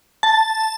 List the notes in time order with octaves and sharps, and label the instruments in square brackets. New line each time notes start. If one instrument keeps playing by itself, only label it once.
[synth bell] A5